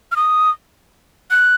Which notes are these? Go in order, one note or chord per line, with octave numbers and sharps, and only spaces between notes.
F6
D#6
F#6